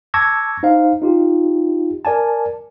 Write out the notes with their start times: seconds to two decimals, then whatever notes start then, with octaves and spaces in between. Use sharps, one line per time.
0.14 A5 C#6 D6 E6 G#6 A#6
0.63 D#4 C5 F5
1.02 D#4 F4 G4
2.05 A#4 D5 G#5 A5